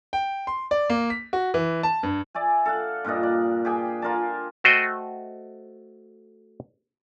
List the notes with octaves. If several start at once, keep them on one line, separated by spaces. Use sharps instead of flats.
G5
C6
D5
A#3
B6
F#4
E3
A5
G2
D5 E5 G#5
A4 F5 F#5
G2 A#2 D4 D#5
D5
G4 G#4 G5
F4 A#4 D5 A5
A3 F#4 C5 D#5 G5